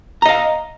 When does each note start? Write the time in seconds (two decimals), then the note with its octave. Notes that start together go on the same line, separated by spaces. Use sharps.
0.22 A#5
0.26 D#5
0.29 F5